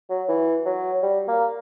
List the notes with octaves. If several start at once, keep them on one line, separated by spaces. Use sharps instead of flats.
F#3
E3
F#3
G3
A#3